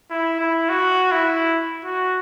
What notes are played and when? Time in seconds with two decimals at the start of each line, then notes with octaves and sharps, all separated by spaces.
0.11 E4
0.40 E4
0.69 F#4
1.12 E4
1.85 F#4